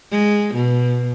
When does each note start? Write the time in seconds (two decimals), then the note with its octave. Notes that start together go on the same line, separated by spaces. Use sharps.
0.12 G#3
0.55 B2